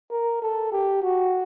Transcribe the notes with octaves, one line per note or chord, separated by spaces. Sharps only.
A#4
A4
G4
F#4